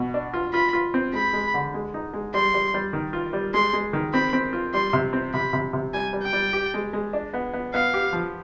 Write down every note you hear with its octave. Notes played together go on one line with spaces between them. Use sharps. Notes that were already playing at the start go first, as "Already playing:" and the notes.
Already playing: B2
D4
F4
F4 B5
F4
C4
G#3 B5
G#3
D3
G#3
D#4
G#3
G3 C6
G3
G3
D#3
F4
G3
G#3 C6
G#3
D#3
C4 B5
C4
F4
G3 C6
C3
C4
C3 B5
C3
C3
G3 G#5
G3
G5
G3
G4
G#3
G#3
D4
B3
B3
B3 F5
G4
F3